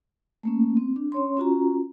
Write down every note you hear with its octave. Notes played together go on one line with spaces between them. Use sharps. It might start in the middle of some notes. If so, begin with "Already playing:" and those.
A3 A#3 C#4
C4
D4
C#4 C#5 C6
C#4 F4 F#4 A#5